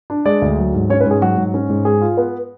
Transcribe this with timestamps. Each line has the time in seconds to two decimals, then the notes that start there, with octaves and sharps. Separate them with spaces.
0.10 D4
0.25 G#3 D5
0.42 D2
0.58 F#3
0.74 G#2
0.90 C#4 C#5
1.01 B4
1.06 G#2
1.11 G#4
1.22 F#3 F#4
1.37 G#2
1.54 C#4
1.69 G#2
1.85 G#3 G#4
2.02 F4
2.17 B3